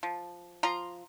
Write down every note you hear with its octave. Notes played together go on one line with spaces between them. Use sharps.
F3
F3 F4 A#5 C6